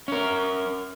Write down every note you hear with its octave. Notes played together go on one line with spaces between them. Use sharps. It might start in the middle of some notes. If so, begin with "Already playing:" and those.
C#4 A#4